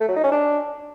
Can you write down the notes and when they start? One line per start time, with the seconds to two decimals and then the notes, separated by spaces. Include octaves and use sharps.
0.01 A3
0.08 F#3
0.16 D#4
0.24 C#4
0.32 D4